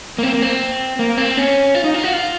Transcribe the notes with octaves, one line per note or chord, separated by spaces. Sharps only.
A#3
C4
A#3
C4
A#3
C4
C#4
F4
D#4
F4
F#4
F4